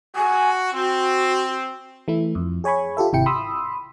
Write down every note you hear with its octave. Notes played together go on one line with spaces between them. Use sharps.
F#4 G#5
C4 F#4
E3 A3 E4
F2
G#4 C#5 G#5 B5 C#6
F4 G4 A4 E5
G#1 C3 E4 G5 C#7
B5 C6 D#6 E6